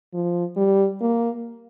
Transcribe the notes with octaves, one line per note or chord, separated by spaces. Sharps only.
F3
G3
A#3